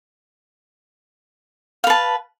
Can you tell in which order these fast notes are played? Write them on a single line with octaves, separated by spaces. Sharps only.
F5 B4 A5